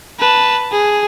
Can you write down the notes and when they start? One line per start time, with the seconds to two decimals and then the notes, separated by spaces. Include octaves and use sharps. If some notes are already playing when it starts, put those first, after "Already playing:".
0.19 B4 A5
0.72 G#4